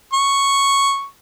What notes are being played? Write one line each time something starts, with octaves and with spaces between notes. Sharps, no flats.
C#6